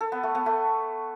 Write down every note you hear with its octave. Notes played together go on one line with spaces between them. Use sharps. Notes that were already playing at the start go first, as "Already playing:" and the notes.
A4
B3
A3
B3
A3